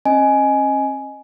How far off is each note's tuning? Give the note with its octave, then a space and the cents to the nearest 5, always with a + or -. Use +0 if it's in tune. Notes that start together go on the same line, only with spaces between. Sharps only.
C#4 -45 D#5 +0 G#5 +15